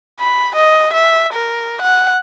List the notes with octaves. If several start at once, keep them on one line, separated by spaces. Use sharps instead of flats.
B5
D#5
E5
A#4
F#5